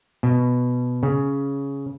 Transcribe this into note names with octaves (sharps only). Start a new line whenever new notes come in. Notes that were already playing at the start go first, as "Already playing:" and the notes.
B2
C#3